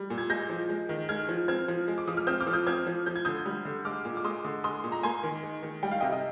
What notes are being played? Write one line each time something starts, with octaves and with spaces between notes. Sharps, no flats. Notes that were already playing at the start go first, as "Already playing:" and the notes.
Already playing: G3
A#2
G#6
G#3 G6 A#6
F3
G#3
D#3
G#3 F6 G#6
F3
C4 F6 G#6
F3
G#3
D6
F3 D#6
F6
C4 D#6 G6
D6 F6
F3
D#6 G6
C4 F6 G#6
F3
F3 G6
G#6
D3 D#6 G6
G3
D3
G#3 D6 F6
A#2
D6
G#3 C6 D#6
D3
G#3 C6 D#6
A#2
A#5
A#3 G#5 C6
D#3
G#3
D#3
G3 G5
F5
C3 D#5 G5
D#5